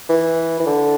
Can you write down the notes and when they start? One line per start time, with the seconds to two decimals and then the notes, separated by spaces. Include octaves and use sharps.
0.09 E3
0.60 E3
0.67 D3